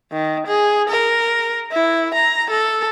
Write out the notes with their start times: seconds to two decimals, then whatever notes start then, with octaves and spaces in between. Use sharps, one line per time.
0.12 D#3
0.47 G#4
0.89 A#4
1.72 E4
2.14 A#5
2.50 A4